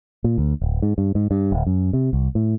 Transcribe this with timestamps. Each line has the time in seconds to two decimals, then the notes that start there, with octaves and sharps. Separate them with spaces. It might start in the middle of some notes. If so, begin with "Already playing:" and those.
0.24 A#2
0.38 D2
0.61 D1
0.82 G#2
0.98 G2
1.15 G#2
1.31 G2
1.52 D1
1.67 F#2
1.93 C3
2.13 C2
2.35 A2